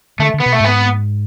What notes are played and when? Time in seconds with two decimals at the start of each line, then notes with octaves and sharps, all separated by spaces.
0.19 D3 A3
0.34 D3
0.40 B3
0.46 B2
0.53 A3
0.60 G#2
0.65 B3